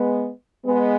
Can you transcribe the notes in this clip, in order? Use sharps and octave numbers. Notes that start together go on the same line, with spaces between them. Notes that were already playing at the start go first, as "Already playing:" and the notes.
Already playing: G#3 B3
G#3 B3